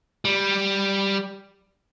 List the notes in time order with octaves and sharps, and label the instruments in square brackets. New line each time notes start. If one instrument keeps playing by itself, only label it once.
[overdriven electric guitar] G3